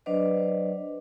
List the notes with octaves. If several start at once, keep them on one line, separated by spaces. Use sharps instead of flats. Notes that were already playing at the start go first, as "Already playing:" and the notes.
F#3 D4 B4 C5 D5 D#5